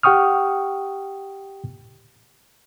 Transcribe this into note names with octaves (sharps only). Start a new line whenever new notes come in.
G4 F#5 G5 C#6 D#6 F6